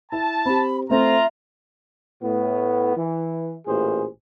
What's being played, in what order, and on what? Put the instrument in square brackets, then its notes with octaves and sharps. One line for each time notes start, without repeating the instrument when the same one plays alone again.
[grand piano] E4 [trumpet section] A5
[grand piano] C4 G4 [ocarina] B5
[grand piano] A3 C4 [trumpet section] F4 A#5 [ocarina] E5
[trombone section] A2 B3
E3
A1 A#2 G#4 C5